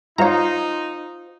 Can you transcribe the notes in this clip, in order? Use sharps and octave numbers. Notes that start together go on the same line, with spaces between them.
D#4 F4 C5 C#5 F5 A#5